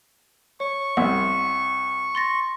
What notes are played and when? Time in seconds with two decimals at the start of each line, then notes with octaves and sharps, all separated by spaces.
0.60 C#5 C#6
0.97 C2 F#5
2.15 C6 A6 A#6